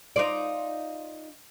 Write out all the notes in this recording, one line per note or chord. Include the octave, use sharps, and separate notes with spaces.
D#4 F4 D5